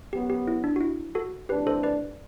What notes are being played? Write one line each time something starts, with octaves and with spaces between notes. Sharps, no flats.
F#2 F#3 B3 G4
G4
E4
D4
F#4
E4
F#4 A4
C3 E3 A3 D4 G4 B4
A4 C5
B4 D5